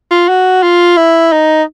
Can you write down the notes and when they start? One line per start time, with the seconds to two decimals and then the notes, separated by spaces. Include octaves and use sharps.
0.11 F4
0.28 F#4
0.63 F4
0.97 E4
1.32 D#4